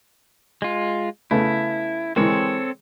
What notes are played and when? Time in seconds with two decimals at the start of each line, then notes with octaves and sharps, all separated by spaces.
0.62 G#3 F4
1.31 C#3 A3 B3 E4
2.16 E3 G#3 C4 A4 A#4 C#5